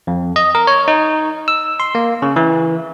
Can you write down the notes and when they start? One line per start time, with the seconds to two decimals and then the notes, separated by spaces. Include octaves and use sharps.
0.07 F2
0.36 D#5
0.55 A#4
0.67 C#5
0.88 D#4
1.48 E6
1.80 C6
1.95 A#3
2.22 C#3
2.36 E3